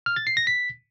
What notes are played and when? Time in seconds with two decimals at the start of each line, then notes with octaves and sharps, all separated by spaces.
0.06 F6
0.16 A6
0.27 C7
0.37 A#6
0.47 B6